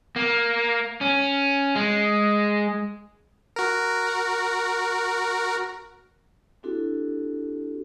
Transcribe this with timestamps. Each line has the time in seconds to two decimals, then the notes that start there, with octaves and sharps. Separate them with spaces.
0.16 A#3
1.01 C#4
1.76 G#3
3.56 F#4 A#4
6.63 C4 D4 E4 F#4 G4 A4